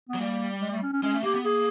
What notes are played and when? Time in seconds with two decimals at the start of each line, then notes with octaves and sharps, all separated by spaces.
0.09 B3
0.14 F#3
0.20 G3 A#3
0.61 G#3
0.72 A3
0.82 C#4
0.93 C#4
1.03 G#3 C#4
1.14 A3
1.23 A#3 G4
1.34 B3
1.45 A#3 G#4